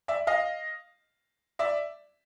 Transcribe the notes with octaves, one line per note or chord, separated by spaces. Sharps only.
D5 E5
D#5 F5
D5 E5